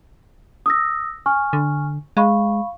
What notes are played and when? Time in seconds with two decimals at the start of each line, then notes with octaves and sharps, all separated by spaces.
0.66 D#6 E6 A#6
1.26 G#5 C#6 F6
1.53 D3
2.17 G#3 F5 B5 C#6